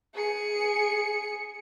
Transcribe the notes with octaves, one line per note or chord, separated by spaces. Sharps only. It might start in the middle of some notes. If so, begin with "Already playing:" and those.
G#4 C#7